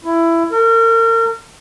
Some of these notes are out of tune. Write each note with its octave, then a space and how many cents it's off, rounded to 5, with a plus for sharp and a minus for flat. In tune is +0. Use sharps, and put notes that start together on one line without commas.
E4 +15
A#4 -35